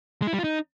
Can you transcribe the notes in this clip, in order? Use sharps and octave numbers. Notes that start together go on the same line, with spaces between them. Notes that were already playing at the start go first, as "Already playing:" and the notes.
G#3
E4
G3
F4
D#4